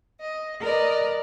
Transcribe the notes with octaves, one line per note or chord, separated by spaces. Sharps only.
D#5
A#4 B4 D5 D#5